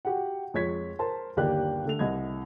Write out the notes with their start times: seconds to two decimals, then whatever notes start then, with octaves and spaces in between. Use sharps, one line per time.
0.05 F#4 G4 F#5
0.54 F2 G#3 C#5 G#6 B6
0.99 A#4 C5 A5 C6
1.37 G1 D#2 A#3 G4 D5 F#6
1.85 D3 A3 F7
1.99 C2 C4 D#5 G#6